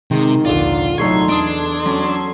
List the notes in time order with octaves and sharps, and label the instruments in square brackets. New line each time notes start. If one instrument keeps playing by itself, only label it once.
[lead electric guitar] C3 [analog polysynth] D#3 [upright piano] G#3
[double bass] A#1 D#2 [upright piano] D3 D5 [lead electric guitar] F4
[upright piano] C2 A3 C#6 [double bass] F#3 D#4 [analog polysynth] A4 C6 G#6
[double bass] E2 [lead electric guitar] D4 [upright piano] D#6 D7
[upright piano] F#3 C#4